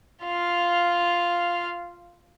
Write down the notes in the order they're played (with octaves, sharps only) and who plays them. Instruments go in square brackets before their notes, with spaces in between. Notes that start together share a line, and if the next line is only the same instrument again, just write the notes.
[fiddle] F4 F5